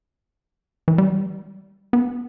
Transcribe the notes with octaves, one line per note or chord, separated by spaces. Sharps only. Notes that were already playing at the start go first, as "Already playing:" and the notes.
E3
G3
B3